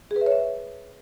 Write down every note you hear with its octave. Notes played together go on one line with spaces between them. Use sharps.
G#4
B4
E5
C#5
E5